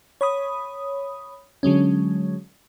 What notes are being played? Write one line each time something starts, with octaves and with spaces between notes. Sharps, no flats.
C#5 B5 D#6
D3 F#3 G#3 C#4